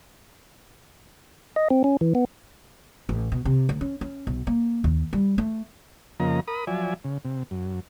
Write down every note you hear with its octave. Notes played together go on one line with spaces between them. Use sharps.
D#5
C4
C#4
E3
B3
A1
B2
C3
D2
C#4
C#4
B1
A#3
D#2
G3
A3
F2 C#3 F3 A#3 D#5 A#5
A#4 B5 D#6
F3 F#3 D5 E5 G#5
C#3
C3
F#2